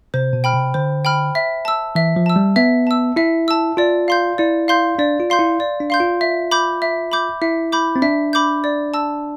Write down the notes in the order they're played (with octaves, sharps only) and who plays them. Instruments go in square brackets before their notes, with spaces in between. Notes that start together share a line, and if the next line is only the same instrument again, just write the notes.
[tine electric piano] C3 [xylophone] C5
[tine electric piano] B2
[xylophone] G5 B5 F6
[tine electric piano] C3
[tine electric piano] D3 [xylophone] C5
[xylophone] G5 B5 F6
E5
A5 E6
[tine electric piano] E3 [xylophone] E5
[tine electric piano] F3
[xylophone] A5 E6
[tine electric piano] G3
[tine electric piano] B3 [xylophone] E5
[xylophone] A5 E6
[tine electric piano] E4 [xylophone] E5
[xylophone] A5 E6
[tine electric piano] F4 [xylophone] D5
[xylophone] F5 C6 G6
[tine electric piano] E4 [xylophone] D5
[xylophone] F5 C6 G6
[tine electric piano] D4 [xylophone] D5
[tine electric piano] F4
[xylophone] F5 C6 G6
[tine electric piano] E4
[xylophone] D5
[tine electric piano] D4
[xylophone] F5 C6 G6
[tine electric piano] F4
[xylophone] E5
B5 D6 G6
E5
B5 D6 G6
[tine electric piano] E4 [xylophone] E5
[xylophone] B5 D6 G6
[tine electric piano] C4
[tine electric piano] D4 [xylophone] E5
[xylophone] B5 D6 G6
D5
A5 E6